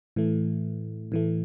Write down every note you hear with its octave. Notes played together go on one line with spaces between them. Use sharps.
A2 E3 A3
A2 E3 A3